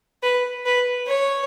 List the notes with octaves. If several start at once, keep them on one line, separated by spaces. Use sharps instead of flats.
B4
B4
C#5